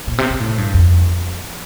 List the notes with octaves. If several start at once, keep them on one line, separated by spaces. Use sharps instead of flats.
A#2
C3
C3
A2
G2
F2